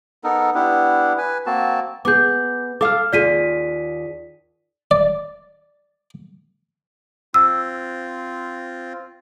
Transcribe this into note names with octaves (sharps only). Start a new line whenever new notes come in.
B3 D#4 A4 A#4
B3 D4 E4 G4
B4 G#5
A#3 C4 F#4 A5
B3 G#4 D6 G6
A4 F5 D6 F6
D#2 F4 G#4 D5 B6 D#7
D5
C4 F4 E6